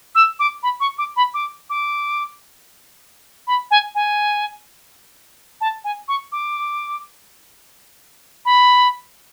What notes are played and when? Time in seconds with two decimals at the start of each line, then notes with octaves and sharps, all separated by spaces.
0.15 E6
0.40 D6
0.63 B5
0.80 C#6
0.98 D6
1.17 B5
1.34 D6
1.70 D6
3.47 B5
3.71 G#5
3.95 G#5
5.61 A5
5.84 G#5
6.08 C#6
6.32 D6
8.45 B5